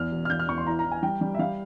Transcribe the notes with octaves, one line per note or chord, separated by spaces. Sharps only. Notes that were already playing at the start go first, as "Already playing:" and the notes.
Already playing: E2 F6
E1
F6
E2 G6
F6
E2 C#6
C6
E3 A#5
A#5
E3
G#5
G3 G5
G3
E5
G3 F5